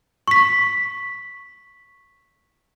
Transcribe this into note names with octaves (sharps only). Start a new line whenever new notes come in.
C#6 B6